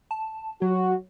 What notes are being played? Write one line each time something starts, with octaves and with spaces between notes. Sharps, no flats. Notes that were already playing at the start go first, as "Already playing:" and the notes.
A5
F#3 F#4